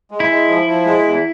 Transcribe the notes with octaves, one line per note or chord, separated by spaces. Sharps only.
G#3
E4
G#3
F3
F3
G#3
E2